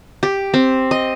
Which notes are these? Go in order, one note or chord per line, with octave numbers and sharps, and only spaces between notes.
G4
C4
D#5